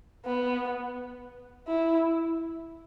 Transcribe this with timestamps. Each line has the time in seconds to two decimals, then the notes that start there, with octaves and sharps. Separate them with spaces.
0.25 B3
1.68 E4